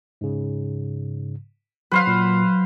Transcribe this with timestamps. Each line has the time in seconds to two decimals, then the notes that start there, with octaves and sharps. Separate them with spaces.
0.21 G#2 C#3
1.91 F#3 B4 C5 F5
2.07 A#2